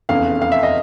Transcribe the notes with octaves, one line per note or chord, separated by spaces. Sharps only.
F1 E2 C#3 F5
F5
E5
D#5